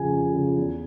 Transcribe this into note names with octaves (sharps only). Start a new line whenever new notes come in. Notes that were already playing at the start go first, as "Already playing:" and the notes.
Already playing: F2 C#3 F3 G#5
F2
C#3 F3
E2